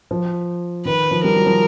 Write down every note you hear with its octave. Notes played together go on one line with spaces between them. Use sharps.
F3
D#3 B4
F3
G3 A#4
F#3
F3